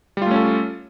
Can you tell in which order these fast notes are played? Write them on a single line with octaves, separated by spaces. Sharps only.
G3 F4 A3 C#4 A4